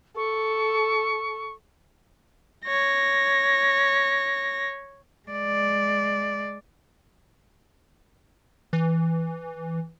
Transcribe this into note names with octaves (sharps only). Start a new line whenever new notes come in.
A4 C#6
C#5 A#6
G#3 D5
E3